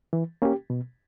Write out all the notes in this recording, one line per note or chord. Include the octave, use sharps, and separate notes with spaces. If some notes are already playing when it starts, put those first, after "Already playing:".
E3
A#3 C#4 G4
B2